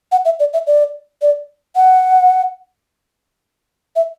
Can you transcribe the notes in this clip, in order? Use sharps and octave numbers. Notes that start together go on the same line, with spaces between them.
F#5
E5
D5
E5
D5
D5
F#5
E5